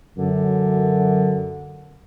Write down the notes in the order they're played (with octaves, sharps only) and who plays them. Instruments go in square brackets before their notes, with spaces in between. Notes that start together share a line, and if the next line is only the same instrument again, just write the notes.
[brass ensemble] F#2 [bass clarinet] D3